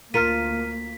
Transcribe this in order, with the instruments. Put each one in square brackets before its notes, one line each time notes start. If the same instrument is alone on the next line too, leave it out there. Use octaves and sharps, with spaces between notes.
[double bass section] D2 A#3 [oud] F4 A#4 [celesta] F6 D#7 [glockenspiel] B6 C#7